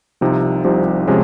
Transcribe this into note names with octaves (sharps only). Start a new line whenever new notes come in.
C2 C3 F3 C4 D#4
C2 C3 F3 C4 D#4
C3 F3 G#3 C#4 G4